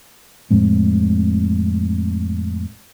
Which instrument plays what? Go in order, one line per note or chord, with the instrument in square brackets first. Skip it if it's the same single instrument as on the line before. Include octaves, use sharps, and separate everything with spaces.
[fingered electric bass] F2 A2 G#3 C4